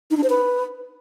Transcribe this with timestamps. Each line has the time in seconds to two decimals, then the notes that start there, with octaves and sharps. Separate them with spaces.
0.11 D#4
0.17 D4
0.23 C5
0.30 B4